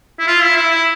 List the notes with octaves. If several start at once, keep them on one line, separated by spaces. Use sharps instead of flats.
E4
F4
E4
E4
E4